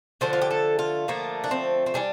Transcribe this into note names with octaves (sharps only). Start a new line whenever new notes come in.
D3 F3 A3 C5
F4
G4
A4
F4
D3 F3 A3 A#3
D4
C4
C4
E3 G3 D4